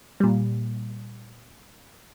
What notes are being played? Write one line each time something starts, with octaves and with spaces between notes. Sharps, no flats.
A#2 G3